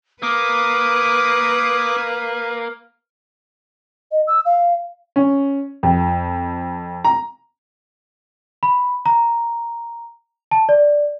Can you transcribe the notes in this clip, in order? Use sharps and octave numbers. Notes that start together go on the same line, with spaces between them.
A#3 B4 D6 D#6 F6
D#5
E6
F5
C#4
F2
A#5
B5
A#5
A5
D5